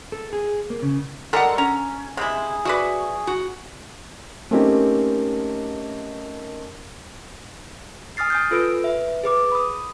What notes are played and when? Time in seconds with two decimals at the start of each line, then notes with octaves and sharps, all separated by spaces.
0.12 A4
0.33 G#4
0.70 A#3
0.82 C#3
1.33 G3 G#3 A4 A#4 F#5
1.58 C#4 A#5
2.17 C3 G#3 E4 G#4
2.65 F#4 B4 D5 E5
3.27 F#4
4.51 A3 A#3 C4 C#4 D#4 G4
8.17 G#5 D#6 F6 A6 C7
8.30 G#5 D#6 G6
8.51 F4 A4 B4 E6 D7
8.84 B4 E5
9.24 G#4 B4 D6
9.52 B5 D#6